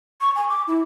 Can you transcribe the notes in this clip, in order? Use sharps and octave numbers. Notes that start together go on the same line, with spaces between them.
C#6
G#5
D6
E4